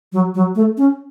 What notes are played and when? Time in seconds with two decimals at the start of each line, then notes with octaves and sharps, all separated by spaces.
0.13 F#3
0.35 F#3
0.55 A3
0.77 C#4